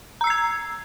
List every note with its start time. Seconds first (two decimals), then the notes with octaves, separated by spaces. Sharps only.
0.21 A#5
0.24 E6
0.27 C7
0.30 G#6